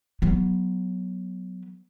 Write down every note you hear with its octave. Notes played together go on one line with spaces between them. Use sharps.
F#3 B3